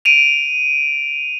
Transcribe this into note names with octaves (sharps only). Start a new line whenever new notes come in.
D7 D#7 F7